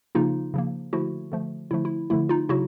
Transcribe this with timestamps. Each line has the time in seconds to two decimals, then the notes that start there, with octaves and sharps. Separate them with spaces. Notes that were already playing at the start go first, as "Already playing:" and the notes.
0.15 C#3 F3 A#3 D#4 F4
0.54 C#3 F3 A#3
0.93 D3 F3 A3 E4 F#4
1.32 D3 F3 A3
1.71 D3 F3 A3 E4
1.85 E4
2.10 D3 F3 A3 E4
2.29 D#4 F4
2.49 C#3 F#3 E4 F#4